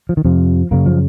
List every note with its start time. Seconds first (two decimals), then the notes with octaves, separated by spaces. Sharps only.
0.09 F3
0.17 D#3
0.25 F2 C3 F3
0.71 F#2 C#3 A#3
0.86 F3